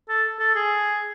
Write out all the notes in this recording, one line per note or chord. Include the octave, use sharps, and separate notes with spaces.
A4
A4
G#4